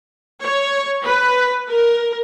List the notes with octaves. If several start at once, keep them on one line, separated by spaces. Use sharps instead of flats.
C#5
B4
A#4